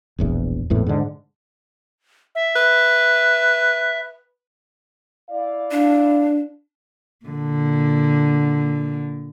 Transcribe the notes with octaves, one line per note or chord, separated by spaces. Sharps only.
E1 A#1 E2
G#1 E2 A2
G#2 D3
E5
B4
E4 D5 F5
D4
A#2 D3